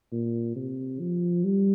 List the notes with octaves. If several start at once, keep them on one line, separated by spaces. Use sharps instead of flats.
A#2
C3
F3
G3